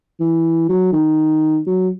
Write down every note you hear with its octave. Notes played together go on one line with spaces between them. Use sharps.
E3
F#3
D#3
F#3